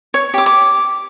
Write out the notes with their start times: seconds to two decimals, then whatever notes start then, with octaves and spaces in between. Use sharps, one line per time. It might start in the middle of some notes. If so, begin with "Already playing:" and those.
0.14 C#5
0.34 G4 D6
0.46 D6